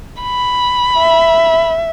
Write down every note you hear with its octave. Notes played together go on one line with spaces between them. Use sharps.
B5
E5